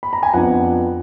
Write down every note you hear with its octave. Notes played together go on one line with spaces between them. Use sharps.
B5
A#5
G#5
F2 F3 B3 D4 F#5